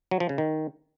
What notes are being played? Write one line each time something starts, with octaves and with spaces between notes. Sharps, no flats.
F#3
F3
C#3
D#3